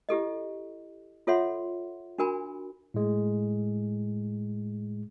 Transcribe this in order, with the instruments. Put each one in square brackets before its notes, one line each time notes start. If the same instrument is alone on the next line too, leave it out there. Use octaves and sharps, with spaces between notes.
[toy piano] E4 G4 A4 D#5
F4 A4 C#5 E5 F#5 C6
D4 F#4 A#4 G#5 B5
[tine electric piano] A2 G#3